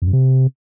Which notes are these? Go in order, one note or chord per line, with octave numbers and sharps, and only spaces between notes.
F2
F#2
C3